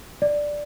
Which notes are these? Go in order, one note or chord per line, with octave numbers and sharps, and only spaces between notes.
D5